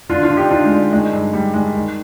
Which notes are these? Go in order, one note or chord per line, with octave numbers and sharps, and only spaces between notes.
D3 D4 F4
D4 F4
D3
D#4 G4
D3 D4 F4
G#3
D3
D#3 G#3
G2
G2 G3
D#3 G#3
D#3